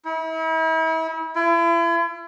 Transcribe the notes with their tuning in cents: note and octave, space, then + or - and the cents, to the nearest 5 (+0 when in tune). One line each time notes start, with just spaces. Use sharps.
E4 -40
E4 +40